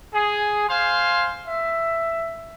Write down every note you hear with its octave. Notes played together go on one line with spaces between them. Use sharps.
G#4
C5 F5 G#5 C6
E5